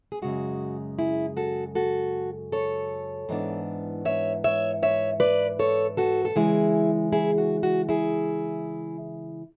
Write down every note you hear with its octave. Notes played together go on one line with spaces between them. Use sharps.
G#4
F#2 C#3 G#3 F#4
E4 G#4
F#4 A4
F#4 A4
A4 C#5
G#2 E3 B3 D4
C#5 E5
C#5 E5
C#5 E5
B4 D5
A4 C#5
F#4 A4
A4
C#3 E3 G#3 E4 G#4
E4 G#4
F#4
F#4
E4 G#4